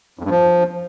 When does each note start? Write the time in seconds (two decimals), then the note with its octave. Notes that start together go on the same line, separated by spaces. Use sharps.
0.19 F2
0.25 G2
0.30 F3